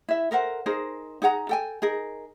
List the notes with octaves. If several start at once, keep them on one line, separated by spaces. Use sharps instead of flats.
E4 E5
A4 A#4 C5 F#5
D#4 G#4 A#4 C5
D#4 G#4 F#5 A#5
A4 G5 G#5
D#4 G#4 A#4